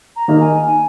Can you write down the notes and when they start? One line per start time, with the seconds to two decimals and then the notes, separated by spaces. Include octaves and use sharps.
0.16 A#5
0.28 D#3 A#3 D#4 A#4
0.40 G#5